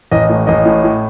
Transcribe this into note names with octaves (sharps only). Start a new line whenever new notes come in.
A1 D#5
A2
A1 D#5
A2
A2